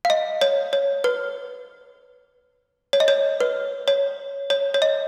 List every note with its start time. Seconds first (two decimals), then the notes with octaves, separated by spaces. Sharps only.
0.05 F5
0.10 D#5
0.41 C#5
0.73 C#5
1.04 B4
2.93 C#5
3.00 D#5
3.08 C#5
3.40 B4
3.88 C#5
4.50 C#5
4.74 C#5
4.82 D#5